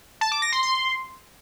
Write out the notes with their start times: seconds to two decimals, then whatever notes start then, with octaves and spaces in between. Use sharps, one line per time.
0.21 A5
0.32 D6
0.42 A#6
0.52 C6
0.63 C6